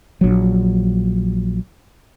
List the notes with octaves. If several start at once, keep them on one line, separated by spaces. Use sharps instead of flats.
A#1 F#3